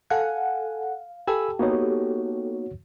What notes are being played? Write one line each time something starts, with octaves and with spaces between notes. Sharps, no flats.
A4 F5 F#5 G#5
G4 A4 G#5 B5 E6
A#3 B3 D#4 F#4 C#5